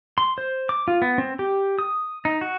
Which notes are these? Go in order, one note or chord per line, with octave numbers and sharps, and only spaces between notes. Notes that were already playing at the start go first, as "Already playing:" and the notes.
C6
C5
D6
F4
B3
C4
G4
D#6
D#4
F#4